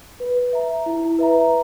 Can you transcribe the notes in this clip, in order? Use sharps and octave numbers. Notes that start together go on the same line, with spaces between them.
B4
E5 A#5
E4
B4 E5 A#5